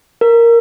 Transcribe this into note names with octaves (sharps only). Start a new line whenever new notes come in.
A#4